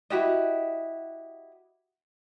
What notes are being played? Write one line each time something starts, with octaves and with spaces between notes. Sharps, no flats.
E4 F#4 G4 D#5